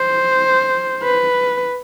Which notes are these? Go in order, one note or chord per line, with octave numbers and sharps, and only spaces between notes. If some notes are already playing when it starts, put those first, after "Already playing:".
Already playing: C5
B4